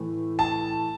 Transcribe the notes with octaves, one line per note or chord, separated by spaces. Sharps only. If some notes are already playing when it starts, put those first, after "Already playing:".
Already playing: A2 E3 A3
A5